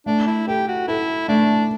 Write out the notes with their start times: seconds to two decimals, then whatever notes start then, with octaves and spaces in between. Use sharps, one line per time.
0.06 A3 D4
0.27 E4
0.48 G4 A4
0.68 F#4
0.88 E4 A4
1.28 A3 D4